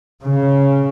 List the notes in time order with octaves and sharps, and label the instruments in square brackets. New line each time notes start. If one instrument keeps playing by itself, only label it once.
[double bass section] C#3